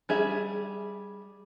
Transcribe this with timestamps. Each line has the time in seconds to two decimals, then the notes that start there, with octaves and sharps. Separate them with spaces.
0.09 G3 G#4 E5